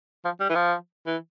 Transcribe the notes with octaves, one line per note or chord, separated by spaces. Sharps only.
F3
G3
E3
F3
E3